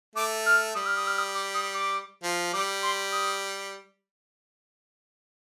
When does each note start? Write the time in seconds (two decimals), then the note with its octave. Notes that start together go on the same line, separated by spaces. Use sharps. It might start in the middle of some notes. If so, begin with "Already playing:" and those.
0.16 A3 D6
0.46 F6
0.75 G3 D#6
0.86 F6
0.96 D#6
1.07 F6
1.18 D#6
1.35 D6
1.54 D#6
1.74 D6
2.23 F3
2.53 G3 D6
2.83 C6
3.12 D#6